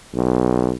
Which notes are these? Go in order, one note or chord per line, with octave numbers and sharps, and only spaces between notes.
B1